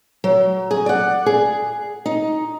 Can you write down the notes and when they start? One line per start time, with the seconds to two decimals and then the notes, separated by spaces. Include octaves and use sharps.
0.24 F#3
0.71 G#4
0.86 D5 F#5
1.26 G#4
2.06 D#4